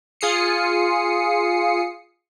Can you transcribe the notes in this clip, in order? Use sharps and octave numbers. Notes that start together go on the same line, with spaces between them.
F4 G#4 D#6 C7 C#7